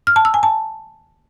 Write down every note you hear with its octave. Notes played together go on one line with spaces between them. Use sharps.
F6
A5
E6
G#5
A5